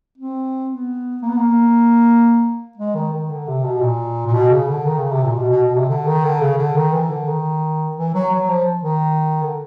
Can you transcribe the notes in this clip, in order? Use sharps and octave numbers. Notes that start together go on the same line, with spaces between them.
C4
B3
A#3
B3
A#3
G#3
D#3
D#3
D3
C3
B2
A#2
A#2
B2
C#3
D3
D#3
C#3
C3
A#2
B2
B2
B2
C3
D3
D#3
D3
C#3
D3
D#3
E3
D3
D#3
E3
F#3
F#3
F3
D#3
D3